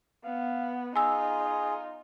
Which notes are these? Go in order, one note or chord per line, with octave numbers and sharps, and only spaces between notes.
B3 F5
D#4 F4 G#4 G#5 E6